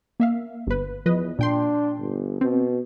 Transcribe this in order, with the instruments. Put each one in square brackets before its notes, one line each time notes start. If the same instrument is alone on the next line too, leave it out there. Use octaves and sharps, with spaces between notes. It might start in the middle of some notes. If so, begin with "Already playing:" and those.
[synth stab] A#3 E5 F5
G1 B4
[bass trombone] E2 [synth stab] F3 B4 D#5
[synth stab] A#2 G5 C6 [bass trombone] D4
[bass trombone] G1
[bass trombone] B2 [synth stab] C4